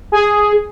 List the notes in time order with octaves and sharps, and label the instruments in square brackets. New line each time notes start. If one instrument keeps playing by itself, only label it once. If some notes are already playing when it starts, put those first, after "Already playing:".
[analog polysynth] G#4